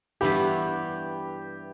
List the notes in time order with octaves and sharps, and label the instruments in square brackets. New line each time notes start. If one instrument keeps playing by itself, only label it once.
[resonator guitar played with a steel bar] G2 E3 B3 E4 [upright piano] G4